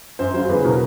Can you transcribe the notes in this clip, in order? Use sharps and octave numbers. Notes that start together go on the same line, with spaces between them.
F#2 C5
C#3 F#3 C5
E2 B4
B2 F#3 A#4